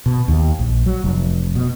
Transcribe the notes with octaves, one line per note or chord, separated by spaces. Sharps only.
B2
D#2
A#1
F#3
F1
B2